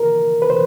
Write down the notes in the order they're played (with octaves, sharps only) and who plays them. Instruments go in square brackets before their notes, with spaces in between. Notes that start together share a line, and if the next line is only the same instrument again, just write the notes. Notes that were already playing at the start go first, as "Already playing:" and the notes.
Already playing: [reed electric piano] A#4
B4
C5